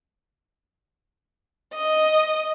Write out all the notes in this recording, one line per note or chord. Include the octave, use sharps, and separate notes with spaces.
D#5